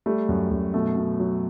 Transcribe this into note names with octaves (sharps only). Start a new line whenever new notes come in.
G3 A3
F#2
F#2
B2 A3
B2
F#3